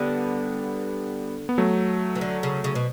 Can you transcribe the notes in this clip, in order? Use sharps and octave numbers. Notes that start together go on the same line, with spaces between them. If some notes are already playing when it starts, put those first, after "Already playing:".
Already playing: D3 G3 B3
B3
F#3 A3
E3
D3
C#3
C#3
B2